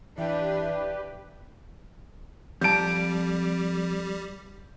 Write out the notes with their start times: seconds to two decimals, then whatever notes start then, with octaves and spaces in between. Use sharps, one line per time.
0.18 E3 D4 G4 B4 E5
2.61 F2 G3 A5 G6 D7